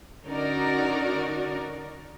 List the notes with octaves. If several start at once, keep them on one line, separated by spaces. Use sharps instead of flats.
D3 C#4 D#4 F#4 A#4 D5